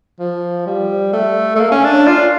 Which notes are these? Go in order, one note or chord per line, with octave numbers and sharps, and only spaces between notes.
F3
G3
A3
A3
A#3
C#4
D4
F4